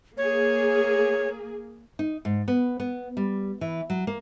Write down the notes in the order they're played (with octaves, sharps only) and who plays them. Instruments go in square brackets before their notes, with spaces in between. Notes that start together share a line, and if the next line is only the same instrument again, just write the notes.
[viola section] A#3 G#4 [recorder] C#5
[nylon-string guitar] D#4
G#2
B3
B3
G3
E3
F#3
A#3